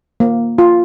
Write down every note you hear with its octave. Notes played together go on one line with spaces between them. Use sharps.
A#3
F4